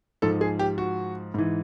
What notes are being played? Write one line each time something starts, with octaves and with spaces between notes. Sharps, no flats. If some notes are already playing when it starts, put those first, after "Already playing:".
G#2 F3 A4
G#4
G4
F#4
G#2 E3